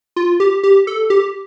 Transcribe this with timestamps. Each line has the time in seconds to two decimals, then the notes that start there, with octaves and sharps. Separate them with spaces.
0.16 F4
0.40 G4
0.64 G4
0.87 A4
1.10 G4